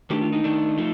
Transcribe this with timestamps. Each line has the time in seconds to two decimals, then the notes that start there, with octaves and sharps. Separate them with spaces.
0.10 D#3 A3 D4 G4
0.21 F4
0.33 D#4
0.44 D#3 A3 D4
0.78 F3 A3